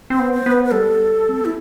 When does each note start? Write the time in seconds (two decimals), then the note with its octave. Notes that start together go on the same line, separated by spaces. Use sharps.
0.10 C4 C5
0.19 B3
0.33 C5
0.46 B3
0.51 B4
0.65 B4
0.71 G3 A4
1.29 C4
1.40 B3
1.45 E4